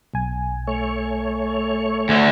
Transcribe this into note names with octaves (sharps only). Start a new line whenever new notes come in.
B1 G#5
A3 C#5
D2 D3